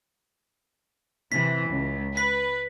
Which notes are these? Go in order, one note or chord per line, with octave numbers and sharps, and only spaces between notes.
C3 E3 B6
C#2
B4 B6